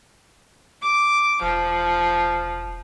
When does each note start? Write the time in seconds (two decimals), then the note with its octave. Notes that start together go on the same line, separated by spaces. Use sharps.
0.82 D6
1.42 E1 F3